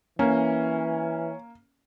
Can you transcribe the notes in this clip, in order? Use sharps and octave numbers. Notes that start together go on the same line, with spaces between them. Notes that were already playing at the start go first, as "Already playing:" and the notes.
E3 A#3 C#4